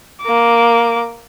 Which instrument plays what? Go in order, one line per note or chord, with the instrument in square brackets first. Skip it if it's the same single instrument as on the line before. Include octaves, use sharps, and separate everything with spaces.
[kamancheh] A#3 D6